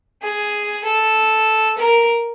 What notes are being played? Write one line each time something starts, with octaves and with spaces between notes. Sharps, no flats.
G#4
A4
A#4